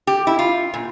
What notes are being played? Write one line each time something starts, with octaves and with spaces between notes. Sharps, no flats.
G4
E4
F4
A#2